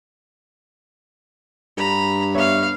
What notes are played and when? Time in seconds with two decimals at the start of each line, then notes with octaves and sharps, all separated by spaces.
1.77 G2 A#5 B5
2.35 B3 C#5 E5 F5